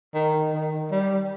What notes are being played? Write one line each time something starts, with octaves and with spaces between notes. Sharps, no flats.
D#3
D#3
G3